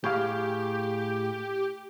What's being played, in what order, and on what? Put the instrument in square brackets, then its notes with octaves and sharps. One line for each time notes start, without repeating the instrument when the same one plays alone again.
[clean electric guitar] A2 G#4 F5 [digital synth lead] G4